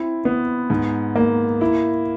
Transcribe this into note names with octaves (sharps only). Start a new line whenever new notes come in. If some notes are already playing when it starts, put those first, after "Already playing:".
Already playing: C4 E4
B3
G#2
A#3
E4